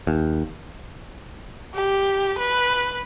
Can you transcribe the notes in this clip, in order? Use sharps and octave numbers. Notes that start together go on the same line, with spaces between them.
D#2
G4
B4